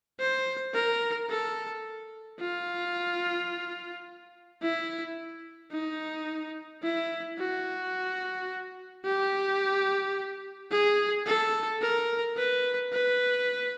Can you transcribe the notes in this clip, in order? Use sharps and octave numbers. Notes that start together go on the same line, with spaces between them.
C5
A#4
A4
F4
E4
D#4
E4
F#4
G4
G#4
A4
A#4
B4
B4